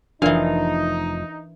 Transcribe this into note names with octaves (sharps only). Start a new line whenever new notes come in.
F1 E3 F3 D4 D#4 A#4 D5 F5